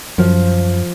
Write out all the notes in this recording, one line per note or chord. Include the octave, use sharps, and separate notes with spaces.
F#2 F3